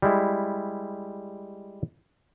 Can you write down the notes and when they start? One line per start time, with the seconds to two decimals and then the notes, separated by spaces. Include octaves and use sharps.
0.02 G3 G#3 E4